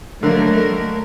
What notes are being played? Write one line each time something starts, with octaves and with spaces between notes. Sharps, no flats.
D3 D#3 F#3 A3 A#3 A#4